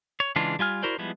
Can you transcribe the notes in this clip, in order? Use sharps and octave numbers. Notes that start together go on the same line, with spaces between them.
C#5
C#3 E3 G#3 D4 F4
G3 F4 G#5 F6
E4 F#4 A#4 C5 D5
F3 G3 G#3 B3 E4